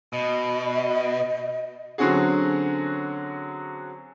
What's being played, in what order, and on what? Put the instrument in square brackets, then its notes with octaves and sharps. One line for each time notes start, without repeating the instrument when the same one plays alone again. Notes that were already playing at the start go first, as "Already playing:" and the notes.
[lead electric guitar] B2 [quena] D#5
[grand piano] D3 F#3 C4 C#4 F#4 G#4